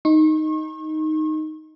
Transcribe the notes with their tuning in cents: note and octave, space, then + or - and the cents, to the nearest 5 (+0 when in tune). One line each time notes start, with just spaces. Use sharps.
D#4 +0 C#6 -40